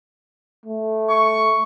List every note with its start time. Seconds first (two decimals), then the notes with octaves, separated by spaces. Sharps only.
0.66 A3
1.09 C#6